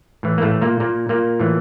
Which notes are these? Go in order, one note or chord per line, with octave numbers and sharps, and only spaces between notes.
A2 E3
A#3
A2 A3
A#2 A#3
A#2 A#3
A#2 A#3
A2 E3